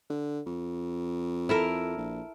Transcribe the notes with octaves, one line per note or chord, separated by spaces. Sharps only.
D3
F2
E4 A4 A#4
A#1